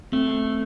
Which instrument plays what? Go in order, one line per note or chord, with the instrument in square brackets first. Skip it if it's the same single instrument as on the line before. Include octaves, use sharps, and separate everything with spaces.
[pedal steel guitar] A3 [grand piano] C4